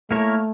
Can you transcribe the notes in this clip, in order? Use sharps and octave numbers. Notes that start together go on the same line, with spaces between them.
A3 A#3 E4 A#4 C#5